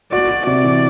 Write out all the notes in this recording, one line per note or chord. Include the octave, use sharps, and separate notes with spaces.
F#4 D5
F#4
C3 D5
E3